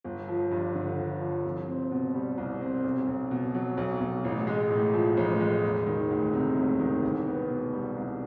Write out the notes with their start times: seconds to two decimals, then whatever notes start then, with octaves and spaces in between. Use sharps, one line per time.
0.04 G1
0.28 F3
0.51 G2
0.75 D3
0.98 G1
1.21 F3
1.45 C2
1.68 C4
1.91 B2
2.14 G3
2.38 C2
2.61 C4
2.84 B1
3.07 B1
3.31 B2
3.55 F#3
3.77 B1
4.00 B1
4.24 A1
4.47 G#3
4.70 A2
4.94 F3
5.17 A1
5.40 G#3
5.64 E1
5.87 D#3
6.10 D2
6.33 C3
6.57 E1
6.80 D#3
7.03 C2
7.27 B3
7.50 B2
7.73 G3
7.96 C2